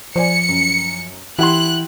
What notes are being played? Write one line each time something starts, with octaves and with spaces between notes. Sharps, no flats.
F3 C5 D5 G#5 C#7
F#2
E3 E4 G4 F#5 G5 C6 F#6